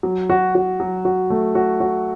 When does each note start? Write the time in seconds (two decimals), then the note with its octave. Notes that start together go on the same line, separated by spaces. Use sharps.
0.03 F#3
0.30 F#4
0.55 F#4
0.80 F#3
1.05 F#4
1.30 A3
1.55 F#4
1.80 F#4